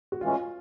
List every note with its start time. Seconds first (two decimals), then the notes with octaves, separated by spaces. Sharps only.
0.12 F#4
0.21 A2 E3 G#3 C#4 F4